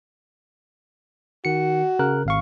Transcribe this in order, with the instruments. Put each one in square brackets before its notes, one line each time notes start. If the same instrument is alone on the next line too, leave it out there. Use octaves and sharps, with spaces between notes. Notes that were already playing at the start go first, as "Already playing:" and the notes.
[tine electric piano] D#3 C#7 [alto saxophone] F#4
[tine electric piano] C#3 A#4 F#6
G#1 F5 C#6